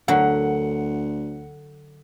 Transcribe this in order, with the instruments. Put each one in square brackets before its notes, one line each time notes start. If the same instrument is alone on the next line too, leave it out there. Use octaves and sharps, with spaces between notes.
[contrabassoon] D2 [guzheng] D3 F#3 A#4 [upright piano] F#5